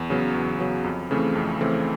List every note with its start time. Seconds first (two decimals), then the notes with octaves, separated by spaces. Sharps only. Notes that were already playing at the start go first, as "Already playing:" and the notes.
Already playing: E2
0.10 C#3 F#3 B3
0.34 E2
0.59 C#3 F#3 B3
0.84 F2
1.11 C#3 E3 A3 C4
1.35 F2
1.61 C#3 E3 A3 C4